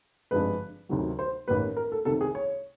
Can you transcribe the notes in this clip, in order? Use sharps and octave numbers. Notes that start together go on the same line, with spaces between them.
G#1 G2 D3 F3 G#3 B4
D2 C3 D#3 F#3
C5
A1 G#2 D#3 G3 A#3 B4
A#4
A4
C2 C3 D#3 A4
G#4
C#5